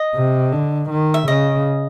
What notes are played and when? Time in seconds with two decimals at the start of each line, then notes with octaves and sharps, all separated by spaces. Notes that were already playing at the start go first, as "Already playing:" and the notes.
Already playing: D#5
0.15 C3
0.52 D3
0.90 D#3
1.14 E5
1.28 C#3 D#5